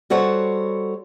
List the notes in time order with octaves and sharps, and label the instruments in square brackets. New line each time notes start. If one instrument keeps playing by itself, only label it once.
[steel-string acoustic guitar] G3 F#4 A4 C5 C#5 F#5